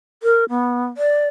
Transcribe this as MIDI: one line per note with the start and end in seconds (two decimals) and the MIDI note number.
0.23 0.45 70
0.49 0.86 59
0.97 1.28 74